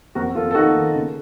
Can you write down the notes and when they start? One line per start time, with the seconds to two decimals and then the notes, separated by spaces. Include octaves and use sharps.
0.15 F2 F#4 A#4
0.35 F2 F4 A4
0.51 A4
0.55 D#3 D#4 F#4
0.75 D#3
0.95 C#3